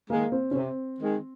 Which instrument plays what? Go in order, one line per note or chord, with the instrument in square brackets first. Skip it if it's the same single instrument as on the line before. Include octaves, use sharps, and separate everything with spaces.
[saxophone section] D#3 G#3 [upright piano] A#3
[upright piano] C4
C#4
[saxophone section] C3 [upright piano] C4
[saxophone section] D#3 G#3